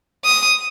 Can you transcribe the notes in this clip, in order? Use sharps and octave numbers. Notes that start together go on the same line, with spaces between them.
D#6